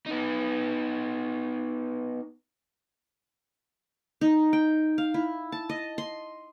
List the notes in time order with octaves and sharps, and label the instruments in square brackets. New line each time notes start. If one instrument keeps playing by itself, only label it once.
[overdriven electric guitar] B3 D#4
[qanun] D#4
G5
F5
E4
A5
D#5
C6